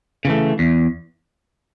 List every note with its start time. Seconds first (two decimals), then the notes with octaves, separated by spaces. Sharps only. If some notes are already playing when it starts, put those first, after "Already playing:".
0.25 C#3 E3 A3
0.59 E2